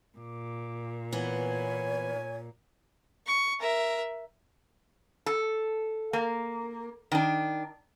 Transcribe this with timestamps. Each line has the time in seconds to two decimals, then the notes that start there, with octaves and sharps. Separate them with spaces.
0.18 A#2 D6
1.12 E3 B3 C#5 G#5
3.26 C#6
3.60 A#4 E5
5.26 A4
6.13 A#3
7.12 D#3 D4